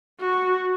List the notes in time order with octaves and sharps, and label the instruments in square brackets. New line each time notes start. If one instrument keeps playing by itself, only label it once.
[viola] F#4